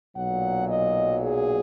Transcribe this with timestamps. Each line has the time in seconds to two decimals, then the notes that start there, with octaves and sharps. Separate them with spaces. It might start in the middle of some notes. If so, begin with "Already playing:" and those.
0.15 B1 A#2 F#3 F#5
0.69 D#5
1.22 G#4